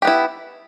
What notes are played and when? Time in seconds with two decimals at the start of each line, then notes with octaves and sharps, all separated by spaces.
0.02 G4
0.05 B3
0.07 E4